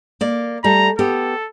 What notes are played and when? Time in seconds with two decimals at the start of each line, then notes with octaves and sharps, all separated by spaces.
0.21 A#3 D5
0.64 G3 A3 A#5
0.99 B3 G4 A4